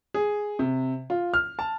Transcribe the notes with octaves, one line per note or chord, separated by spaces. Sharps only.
G#4
C3
F4
F6
A5